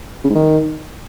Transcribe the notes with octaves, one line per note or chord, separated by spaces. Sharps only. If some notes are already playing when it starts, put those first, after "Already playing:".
C#3
G#2
D#3